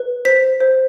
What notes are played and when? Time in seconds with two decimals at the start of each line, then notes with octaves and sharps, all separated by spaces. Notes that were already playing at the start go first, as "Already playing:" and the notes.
Already playing: B4
0.25 C5 B6
0.61 C5